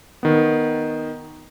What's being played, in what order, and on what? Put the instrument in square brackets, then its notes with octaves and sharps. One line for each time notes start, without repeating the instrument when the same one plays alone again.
[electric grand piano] D#3 B3